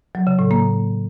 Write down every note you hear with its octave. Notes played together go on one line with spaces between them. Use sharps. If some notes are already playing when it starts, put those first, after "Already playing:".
F#3
C#3
A2
A#3